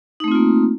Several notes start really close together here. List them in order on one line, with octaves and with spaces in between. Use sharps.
D#4 A3 C4 F4 A#3